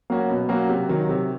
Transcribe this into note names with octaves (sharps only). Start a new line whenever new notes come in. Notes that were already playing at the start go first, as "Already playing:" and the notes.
F#3 A#3 C#4 F#4
B2
F#3 A#3 C#4 F#4
C3
D#3 F#3
C3